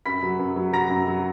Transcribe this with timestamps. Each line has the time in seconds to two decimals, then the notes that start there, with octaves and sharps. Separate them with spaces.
0.06 F#2 B5 B6
0.23 F#3
0.39 F#2
0.56 F#3
0.73 F#3 A#5 A#6
0.90 F#2
1.07 F#3